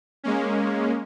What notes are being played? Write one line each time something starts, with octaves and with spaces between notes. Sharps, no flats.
G#3 A#3 C#4